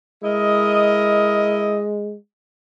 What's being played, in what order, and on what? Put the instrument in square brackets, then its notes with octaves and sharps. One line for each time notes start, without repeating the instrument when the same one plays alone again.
[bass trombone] G#3 [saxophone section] E4 A#4 D#5